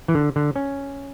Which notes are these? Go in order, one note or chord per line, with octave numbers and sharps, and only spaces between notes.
E3
D3
D3
C#4